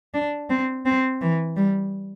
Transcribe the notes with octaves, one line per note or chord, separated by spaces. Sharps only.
D4
C4
C4
E3
G3